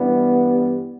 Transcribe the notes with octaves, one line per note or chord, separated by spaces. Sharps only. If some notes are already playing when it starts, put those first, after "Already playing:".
Already playing: G2 E3 G3 B3